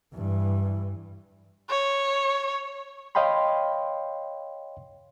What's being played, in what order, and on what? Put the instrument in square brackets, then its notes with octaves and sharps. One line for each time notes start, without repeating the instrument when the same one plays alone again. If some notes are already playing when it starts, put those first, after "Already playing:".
[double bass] G2 E3
[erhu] C#5
[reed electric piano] C#5 D#5 F5 G5 B5 C6